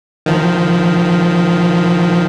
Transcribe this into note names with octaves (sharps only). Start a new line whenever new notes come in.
D#3 F3